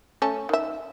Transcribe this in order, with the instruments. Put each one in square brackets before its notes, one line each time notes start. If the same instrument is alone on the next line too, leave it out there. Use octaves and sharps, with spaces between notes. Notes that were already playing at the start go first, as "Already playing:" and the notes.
[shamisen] A3 C#4 A4
D#3 E5